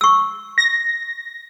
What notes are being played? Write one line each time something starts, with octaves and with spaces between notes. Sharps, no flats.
C#6 E6
A#6